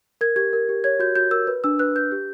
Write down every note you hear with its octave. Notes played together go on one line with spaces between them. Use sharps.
A#4 G#6
G4 G#6
A#4
G4
C#5 G#6
F#4 G6
F#4 G6
A#4 E6
B4
D4 E6
B4 F#6
B4 G6
G4